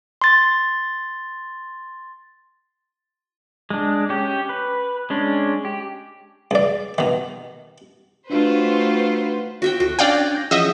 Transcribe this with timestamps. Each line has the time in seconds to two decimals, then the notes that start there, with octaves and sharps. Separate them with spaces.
0.22 C6 A6
3.70 G#3 D4
4.09 C#4 G4
4.49 B4
5.10 G#3 C#4 D4
5.65 G4
6.51 C#2 D5
6.98 B2 D#3
8.30 A3 D4 D#4 F4 F#4 B4 C5
9.62 F4 F#4 E5 G5
9.80 D2 F#4 A4
9.99 C#4 D4 D5 F5 G5 G#5
10.35 G6 A#6
10.51 E3 F3 C#4 G#4 D#5 E5 F#5 D#6